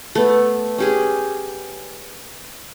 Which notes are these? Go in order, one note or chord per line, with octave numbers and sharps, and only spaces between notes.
A3 B3
C#4 G4 G#4